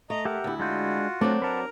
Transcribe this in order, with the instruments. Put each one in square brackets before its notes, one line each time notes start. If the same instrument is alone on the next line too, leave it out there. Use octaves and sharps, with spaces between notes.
[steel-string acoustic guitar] A3 [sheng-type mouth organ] D#5 A#5
[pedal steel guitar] G4 E5 F#5 [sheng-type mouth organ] A#4
[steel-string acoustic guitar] D2 E4
[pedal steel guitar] G#3 D4 G6 [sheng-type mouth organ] F4 F#4
[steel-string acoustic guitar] F#3 C4 D4 [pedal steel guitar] A3
[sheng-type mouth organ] A#4 [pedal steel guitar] B4 F#5 A5